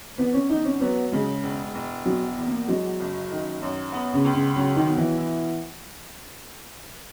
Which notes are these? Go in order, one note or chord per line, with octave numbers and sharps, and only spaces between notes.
E2 B3
C#4
E2 D#4
C#4
F#3 B3
C#3 G#3
E1
E1
B2 F#3
E2
A#3
F#3 G#3
F#1
D#3
F#2
B3
C#3
C#2
C#3
C#3 F#3
D#3
B2
E3
E4